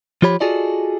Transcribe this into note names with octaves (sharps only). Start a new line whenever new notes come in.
F3 F4 G4 C#5 B5
F4 F#4 G#4 A4 D5 D#5